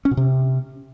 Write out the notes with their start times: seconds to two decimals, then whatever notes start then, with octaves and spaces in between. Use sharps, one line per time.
0.05 C#4
0.11 B2
0.17 C3